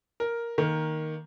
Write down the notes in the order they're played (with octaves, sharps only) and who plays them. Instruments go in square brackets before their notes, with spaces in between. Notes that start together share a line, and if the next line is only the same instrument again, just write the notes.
[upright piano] A#4
D#3 A#3